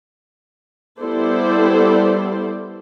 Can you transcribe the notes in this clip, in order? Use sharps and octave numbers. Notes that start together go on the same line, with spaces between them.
G3 B3 E4 A4 C5 D5